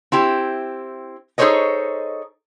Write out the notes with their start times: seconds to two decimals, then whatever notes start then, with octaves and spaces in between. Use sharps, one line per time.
0.12 C4 E4 G4
1.38 D#4 G#4 A4 C5 C#5 D#5